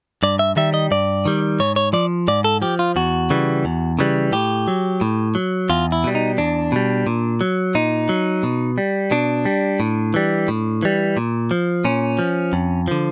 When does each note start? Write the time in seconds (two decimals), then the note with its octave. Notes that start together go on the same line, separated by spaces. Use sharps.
0.23 G2 D5
0.39 E5
0.57 D#3 G3 E5
0.74 D#5
0.91 G2 D5
1.25 D#3 G3
1.60 G#2 C#5
1.76 C#5
1.93 F3 D5
2.28 G#2 D5
2.44 A4
2.62 F3 G4
2.79 F4
2.96 E2 F#4
3.30 C#3 E3 G3
3.65 E2
3.99 C#3 E3 G3
4.32 A2 G4
4.68 F#3
5.01 A2
5.35 F#3
5.70 E2 F4
5.92 E4
6.04 B2 G3
6.15 D#4
6.38 E2 D4
6.72 B2 G3
7.07 A#2
7.41 F#3
7.75 A#2 D#4
8.09 F#3
8.43 B2
8.78 G3
9.11 B2 D4
9.45 G3
9.80 A2
10.14 E3 G3
10.48 A2
10.83 E3 G3
11.17 A#2
11.51 F3
11.85 A#2 C#4
12.19 F3
12.53 F2
12.88 D3 F3